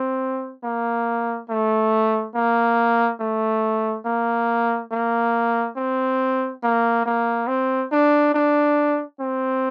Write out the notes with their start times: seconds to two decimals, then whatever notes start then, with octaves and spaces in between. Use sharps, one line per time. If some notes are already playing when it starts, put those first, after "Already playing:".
Already playing: C4
0.64 A#3
1.50 A3
2.35 A#3
3.20 A3
4.06 A#3
4.92 A#3
5.77 C4
6.63 A#3
7.06 A#3
7.48 C4
7.92 D4
8.35 D4
9.20 C4